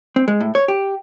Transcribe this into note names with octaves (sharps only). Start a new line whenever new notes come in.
C4
G#3
A2
C#5
G4